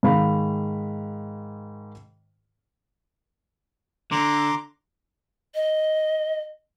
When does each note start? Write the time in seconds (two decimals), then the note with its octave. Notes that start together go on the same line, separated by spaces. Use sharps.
0.03 G#2 D#3 G#4 F5 B5
4.12 D3 A#5 C6 D6
5.55 D#5